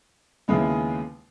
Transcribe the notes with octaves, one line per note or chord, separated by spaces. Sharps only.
D#2 C#3 G#3 B3 E4